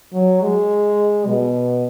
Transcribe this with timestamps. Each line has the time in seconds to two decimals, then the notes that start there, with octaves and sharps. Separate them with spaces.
0.13 F#3
0.42 G#3
1.27 B2